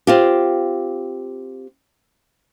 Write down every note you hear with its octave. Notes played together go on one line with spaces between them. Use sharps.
C4 F4 G4